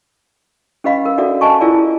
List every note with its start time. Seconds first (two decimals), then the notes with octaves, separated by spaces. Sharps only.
0.84 C#4 G4 B4 D#5 F5 B5
1.05 A#4
1.18 D4 F#4 A4 D5 E5 F#5
1.41 C5 D#5 G#5 A5 C#6
1.61 E4 F4 G#4 A#4 D5 B5